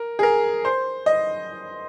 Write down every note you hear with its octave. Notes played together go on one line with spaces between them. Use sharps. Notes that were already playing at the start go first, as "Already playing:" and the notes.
Already playing: A#4
G#4
A#4
C5
D#5